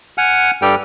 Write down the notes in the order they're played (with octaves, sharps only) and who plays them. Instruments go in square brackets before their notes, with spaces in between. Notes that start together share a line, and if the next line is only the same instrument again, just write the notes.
[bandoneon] F#5 G#5 F6
G2 G3 G4 A4 G5 F6